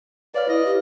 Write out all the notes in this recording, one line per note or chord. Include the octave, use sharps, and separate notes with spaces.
B4 C#5 D5 F5 F6
E4 D#5
G4